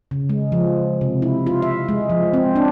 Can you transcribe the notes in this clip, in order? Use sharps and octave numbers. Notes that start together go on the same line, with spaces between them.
C#3
G#3
F3
C3
E4
F4
E5
G#3
F3
C4
D4